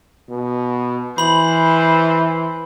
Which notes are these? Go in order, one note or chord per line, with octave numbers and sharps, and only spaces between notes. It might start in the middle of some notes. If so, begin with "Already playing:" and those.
B2
E3 C5 B5 F#7